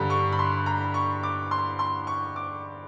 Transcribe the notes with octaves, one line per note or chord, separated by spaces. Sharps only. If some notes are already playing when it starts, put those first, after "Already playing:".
Already playing: G2 D3 G3 A#5
C#6
B5
C6
A#5
C#6
D6
C6
C6
C#6
D6